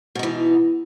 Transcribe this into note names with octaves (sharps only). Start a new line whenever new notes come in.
B2 E3 D#4